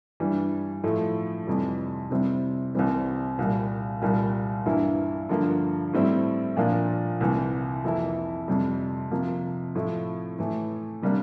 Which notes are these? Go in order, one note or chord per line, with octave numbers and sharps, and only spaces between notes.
G2 E3 G3
A2 F3 A3 E4
F2 C3 E3 G3
C3 G3 C4 E4
C2 C3 E3 G3 C4
C2 A#2 G3
C2 A#2 G3 A#3
G2 E3 A#3 E4
G2 D3 F3 A#3
A2 G3 C4 E4
A#2 F3 A#3 D4
C2 C3 E3
F2 E3 A#3 E4
F2 C3 G3
C3 F3 A#3
A2 F3 A3 E4
A2 E3 A3
C3 G3 A#3 D4